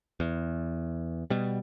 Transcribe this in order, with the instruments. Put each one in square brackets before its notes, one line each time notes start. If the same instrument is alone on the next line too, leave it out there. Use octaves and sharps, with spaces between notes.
[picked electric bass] E2
B2 G3